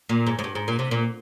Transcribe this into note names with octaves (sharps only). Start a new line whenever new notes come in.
A#2
G#2
G#2
G2
G#2
A#2
C3
A#2